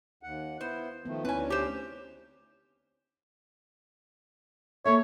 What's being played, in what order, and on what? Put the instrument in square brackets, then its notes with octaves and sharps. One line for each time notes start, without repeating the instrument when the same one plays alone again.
[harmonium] D#2 F#5
[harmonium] B3 E4 [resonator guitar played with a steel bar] C5
[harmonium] D#3 F3 A3 [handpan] B3
[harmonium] D2 C#4 [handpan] C4 D#4 E4 [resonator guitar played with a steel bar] B4 G#5
[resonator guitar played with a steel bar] G4 C5
[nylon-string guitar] A#3 A4 E5 [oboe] C#5